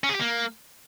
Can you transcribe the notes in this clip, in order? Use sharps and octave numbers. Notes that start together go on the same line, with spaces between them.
C#4
G#4
G4
A#3